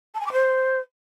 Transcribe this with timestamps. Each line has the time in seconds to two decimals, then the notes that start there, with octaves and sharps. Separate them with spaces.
0.14 A5
0.20 G#5
0.26 D6
0.32 C5